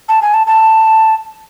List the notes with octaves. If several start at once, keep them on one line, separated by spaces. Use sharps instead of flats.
A5
G#5
A5
A5